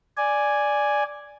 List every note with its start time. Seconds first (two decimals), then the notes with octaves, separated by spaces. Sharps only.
0.17 D5 G#5